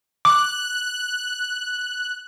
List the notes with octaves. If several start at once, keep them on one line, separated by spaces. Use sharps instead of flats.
D6 F#6